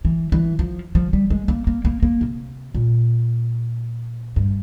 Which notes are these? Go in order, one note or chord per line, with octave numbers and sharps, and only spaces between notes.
E3
E3
F3
F3
G3
G#3
A#3
A#3
A#3
A#3
C3
A#2
G2